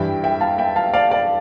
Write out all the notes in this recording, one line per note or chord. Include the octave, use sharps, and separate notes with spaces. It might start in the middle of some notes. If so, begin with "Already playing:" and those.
Already playing: G2 E3 E5 G5
E5 G5
F5 A5
E5 G5
F5 A5
D5 F5
D5 F5